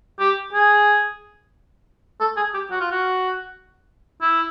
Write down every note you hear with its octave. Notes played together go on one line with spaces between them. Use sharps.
G4
G#4
A4
G#4
G4
F#4
F4
F#4
E4